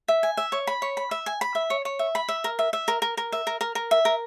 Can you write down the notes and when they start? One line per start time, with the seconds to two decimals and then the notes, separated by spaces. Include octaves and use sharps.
0.08 E5
0.23 G#5
0.37 E5
0.52 C#5
0.67 B5
0.82 C#5
0.97 B5
1.11 E5
1.26 G#5
1.41 B5
1.55 E5
1.70 C#5
1.85 C#5
1.99 E5
2.15 B5
2.28 E5
2.44 A#4
2.59 E5
2.73 E5
2.88 A#4
3.02 A#4
3.17 A#4
3.32 E5
3.47 A#4
3.61 A#4
3.75 A#4
3.91 E5
4.05 A#4